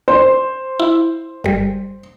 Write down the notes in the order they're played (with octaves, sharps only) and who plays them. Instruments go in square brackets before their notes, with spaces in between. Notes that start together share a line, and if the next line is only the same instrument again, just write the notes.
[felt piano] C5
[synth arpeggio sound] E4
G1 G3